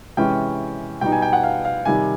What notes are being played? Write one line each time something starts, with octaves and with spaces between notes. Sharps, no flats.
C3 E3 G#3 C#4 G5
B2 G3 B3 D#4 G5
G#5
G5
F#5
F5
F5
C3 D#3 G3 G#5